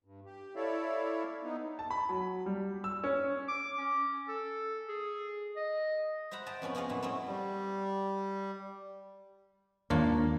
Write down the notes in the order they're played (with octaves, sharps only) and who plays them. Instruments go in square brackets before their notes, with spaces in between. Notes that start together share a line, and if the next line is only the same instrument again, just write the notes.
[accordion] G2
G4
E4 A4 C#5 D5 E5 F5
B3 D#4
[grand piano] A5
B5
F#3
G3
E6
C#4
[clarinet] D6
C#4
A4
G#4
D#5
[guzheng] C5 E5 F#5 A#5 B5
D#5 G5 A5 A#5
F2 B3 C#4 B5
B3 C#4 F4 G#4 D#5 F5
F#2 A#2 E4
A3 C4 E4 D#5
[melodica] G3
[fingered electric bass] D#2 D#3 G#3 [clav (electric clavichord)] A#3 [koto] D4 F4 C#5